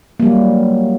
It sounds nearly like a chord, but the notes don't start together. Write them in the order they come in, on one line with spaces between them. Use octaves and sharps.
A#3 G3 F#3